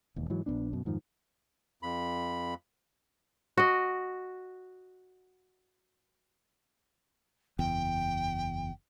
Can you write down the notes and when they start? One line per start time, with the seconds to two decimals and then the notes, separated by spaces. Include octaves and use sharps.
0.16 E1 D#2
0.30 G#2 E3 F#3
0.46 A#1 G2 B3 D4
0.73 F#2 B2
0.85 F2 G#2 D#3 F3
1.83 F2 B5
3.57 F#4 D#5
7.59 F#1 E2 G5